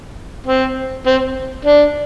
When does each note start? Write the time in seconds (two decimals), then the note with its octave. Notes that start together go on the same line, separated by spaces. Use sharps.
0.47 C4
1.07 C4
1.65 D4